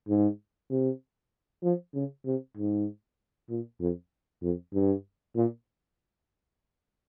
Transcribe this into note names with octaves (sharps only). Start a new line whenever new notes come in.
G#2
C3
F3
C#3
C3
G#2
A#2
F2
F2
G2
A#2